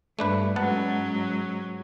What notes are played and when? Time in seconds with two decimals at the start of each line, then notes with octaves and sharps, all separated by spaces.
0.19 G2 A3 D4 B4
0.56 G#2 F#3 B3 C#4 F#5 A5